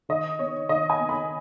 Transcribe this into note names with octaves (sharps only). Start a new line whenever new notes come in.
D#3 D#5
B3 C#5
D#3 D#5
G#5
B3
B5